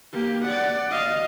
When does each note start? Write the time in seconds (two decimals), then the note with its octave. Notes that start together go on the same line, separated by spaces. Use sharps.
0.13 A#3 G4
0.45 D5 F#5
0.90 D#5 F5